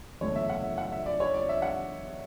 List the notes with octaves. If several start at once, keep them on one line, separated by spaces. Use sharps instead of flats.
F#1 E2 D3 A3 C#5
E5
F#5
E5
F#5
E5
D5
C#5
D5
E5
F#5